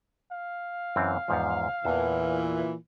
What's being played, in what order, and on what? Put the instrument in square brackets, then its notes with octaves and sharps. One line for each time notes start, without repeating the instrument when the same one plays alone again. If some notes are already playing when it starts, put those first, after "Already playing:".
[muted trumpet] F5
[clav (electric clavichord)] F#2 E3 C4
E2 G#2 F3
[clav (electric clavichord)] E2 A5 [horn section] A#2 E3